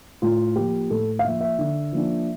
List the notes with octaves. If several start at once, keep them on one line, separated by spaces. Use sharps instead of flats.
A2 F4
F3 A#3 G4
A2 A4
F5
F3 A#3 E5
E5
D3
F3 A#3 D4